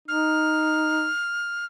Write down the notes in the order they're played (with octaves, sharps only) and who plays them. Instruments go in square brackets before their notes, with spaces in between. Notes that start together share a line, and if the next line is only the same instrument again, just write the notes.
[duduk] D#4 [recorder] F6